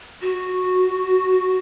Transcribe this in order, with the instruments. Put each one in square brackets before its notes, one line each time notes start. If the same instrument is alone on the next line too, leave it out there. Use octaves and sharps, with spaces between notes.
[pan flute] F#4